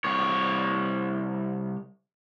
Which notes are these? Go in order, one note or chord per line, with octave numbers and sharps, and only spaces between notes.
C2 C#5